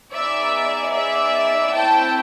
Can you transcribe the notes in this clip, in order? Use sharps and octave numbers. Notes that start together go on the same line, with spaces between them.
B3 D#4 G#4 D5 E5
D5 E5
A3 C4 E4 G5 A5